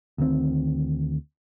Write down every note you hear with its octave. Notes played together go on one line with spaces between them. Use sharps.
D2 D#3 C4